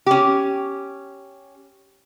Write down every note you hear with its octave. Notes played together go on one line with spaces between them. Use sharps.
C#4 G4